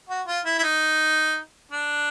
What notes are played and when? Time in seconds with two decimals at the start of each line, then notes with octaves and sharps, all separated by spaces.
0.09 F#4
0.27 F4
0.45 E4
0.58 E4
0.63 D#4
1.71 D4